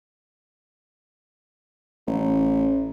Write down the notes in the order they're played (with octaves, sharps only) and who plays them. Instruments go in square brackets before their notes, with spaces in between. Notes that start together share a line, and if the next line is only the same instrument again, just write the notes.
[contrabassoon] A1